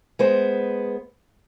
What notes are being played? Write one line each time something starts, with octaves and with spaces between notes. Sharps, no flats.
G#3 B3 C5